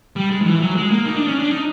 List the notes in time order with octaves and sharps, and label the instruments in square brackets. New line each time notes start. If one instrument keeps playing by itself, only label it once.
[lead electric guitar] G3
G#3
F3
E3
F#3
G#3
A#3
D#4
D4
C#4
D4
D#4